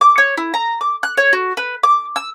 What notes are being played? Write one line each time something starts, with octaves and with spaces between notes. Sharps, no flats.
D6
C#5
E4
A#5
D6
F#6
C#5
F#4
B4
D6
E6